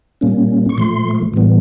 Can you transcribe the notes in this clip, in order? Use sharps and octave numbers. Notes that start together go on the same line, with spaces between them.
A#2 G3 A#3 C#4
C#6
A#2 F3 A3 C6
A2 E3 G3 B3